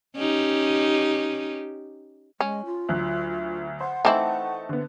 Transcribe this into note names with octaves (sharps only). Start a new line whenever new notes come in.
C#4 D#4 G4
G#3 C#4
F4
D2 F#3 F#6
C5 F#5
E3 A3 C4 D#4 E4 A5
D3 B3